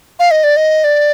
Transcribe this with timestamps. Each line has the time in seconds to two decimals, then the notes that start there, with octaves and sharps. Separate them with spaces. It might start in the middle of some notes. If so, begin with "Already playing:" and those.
0.19 F5
0.31 D#5
0.44 D5
0.57 D#5
0.84 D5